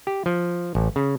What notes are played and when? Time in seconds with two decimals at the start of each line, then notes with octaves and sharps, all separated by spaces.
0.07 G4
0.26 F3
0.75 A1
0.96 C#3